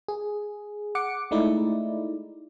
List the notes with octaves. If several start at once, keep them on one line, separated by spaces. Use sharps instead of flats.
G#4
F#5 D6 C#7
G#3 A3 D#4 E4 D5